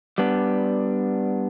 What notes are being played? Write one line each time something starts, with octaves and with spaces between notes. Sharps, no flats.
G3 B3 D4